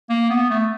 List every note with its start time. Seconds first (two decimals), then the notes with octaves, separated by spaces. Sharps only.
0.10 A#3
0.30 B3
0.50 A3